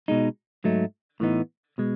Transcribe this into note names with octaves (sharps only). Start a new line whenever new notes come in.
B2 G#3 D#4
G#2 F#3 A3 D#4
A2 E3 B3 D#4
B2 G#3